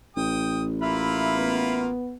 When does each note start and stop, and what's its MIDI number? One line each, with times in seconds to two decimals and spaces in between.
0.17 2.05 33
0.17 0.63 79
0.17 0.63 87
0.82 1.90 58
0.82 1.90 65
0.82 1.80 76
0.82 1.80 83
1.35 2.16 59